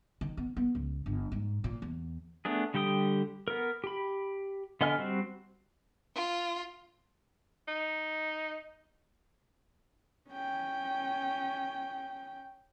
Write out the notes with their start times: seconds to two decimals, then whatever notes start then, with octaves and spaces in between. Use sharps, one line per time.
0.21 D#3
0.37 B3
0.57 B3
0.75 C#2
1.06 G1
1.32 G#2
1.64 A#2
1.82 E2
2.45 A3 B3 D4 G#4
2.74 D3 G3 G4 G5 D#6
3.48 B3 A#4
3.84 G4 B5
4.81 D3 B3 D#5 G#5 F6
4.99 G3 C4 F#4
6.14 F4
7.68 D#4
10.30 C#4 G5